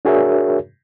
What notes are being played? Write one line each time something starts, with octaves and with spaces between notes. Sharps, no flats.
D4 F#4 G#4 A#4 C#5 E5